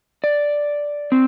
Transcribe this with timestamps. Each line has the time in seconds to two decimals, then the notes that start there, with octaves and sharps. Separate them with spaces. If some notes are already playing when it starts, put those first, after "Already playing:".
0.24 D5
1.12 C4